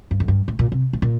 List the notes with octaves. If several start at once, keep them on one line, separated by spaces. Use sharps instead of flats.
G2
F2
G2
A2
A#2
C3
A2
A#2